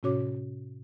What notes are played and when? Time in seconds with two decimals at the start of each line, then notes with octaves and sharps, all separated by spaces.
0.03 A2 C3 C#4 F#4 C#5 D6